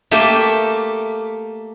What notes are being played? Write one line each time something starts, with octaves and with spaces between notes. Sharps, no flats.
A3 A#3 G4 E5